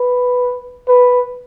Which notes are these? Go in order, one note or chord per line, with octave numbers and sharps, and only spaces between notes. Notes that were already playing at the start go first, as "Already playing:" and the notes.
Already playing: B4
B4